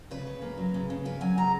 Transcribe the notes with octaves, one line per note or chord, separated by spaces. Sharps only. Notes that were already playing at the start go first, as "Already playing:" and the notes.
C#3 B4
C#3
A#3
F#3
C#3
C#3
A#3 B4
F#3 G#5
C#3 A#5